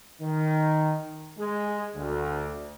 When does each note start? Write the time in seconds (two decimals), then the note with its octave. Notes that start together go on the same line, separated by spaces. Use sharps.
0.21 D#3
1.38 G#3
1.95 D2